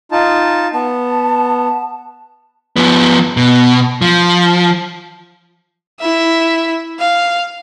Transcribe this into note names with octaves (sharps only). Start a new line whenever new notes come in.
D#4 F4 A5
B3 A5
F3 B3
B2
F3
E4 E5
F5